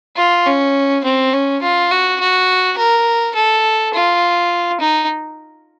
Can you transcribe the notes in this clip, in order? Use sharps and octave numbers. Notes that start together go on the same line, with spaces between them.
F4
C#4
C4
C#4
F4
F#4
F#4
A#4
A4
F4
D#4